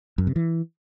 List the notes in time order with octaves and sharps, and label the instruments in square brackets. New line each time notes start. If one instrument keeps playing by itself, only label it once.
[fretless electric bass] F#2
C3
E3